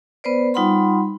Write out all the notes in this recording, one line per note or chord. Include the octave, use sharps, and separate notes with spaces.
B3 B4 C5 D5
G3 D#4 F4 F#5 B5 C6